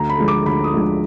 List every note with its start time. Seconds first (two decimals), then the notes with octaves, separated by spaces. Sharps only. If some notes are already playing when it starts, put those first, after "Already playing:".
Already playing: D2 A#5
0.10 B5
0.19 D3 F3 G#3
0.28 D6
0.46 D2 B5
0.64 D#6
0.74 D3 F3 G#3